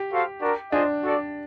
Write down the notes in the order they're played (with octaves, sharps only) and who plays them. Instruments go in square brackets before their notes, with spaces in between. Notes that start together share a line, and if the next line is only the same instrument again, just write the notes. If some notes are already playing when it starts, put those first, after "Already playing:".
Already playing: [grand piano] G4
[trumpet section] F#4 A4 C5 F5
D4 F#4 A#4
[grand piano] D4 [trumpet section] F4 G#4 C5 D#5
[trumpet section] F#4 A4 D5